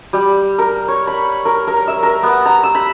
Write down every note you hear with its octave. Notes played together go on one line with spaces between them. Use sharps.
G3
A#4
C#5
B5
A#4
A#4
E5
A#4
B3
A#5
E6
B5